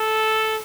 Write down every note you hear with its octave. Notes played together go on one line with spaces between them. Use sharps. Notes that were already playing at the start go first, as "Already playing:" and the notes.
Already playing: A4